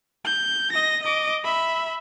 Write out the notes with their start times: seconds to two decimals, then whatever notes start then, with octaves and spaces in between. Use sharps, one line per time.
0.25 G6
0.72 D#5 A#6
1.03 D#5 D6
1.44 E5 B5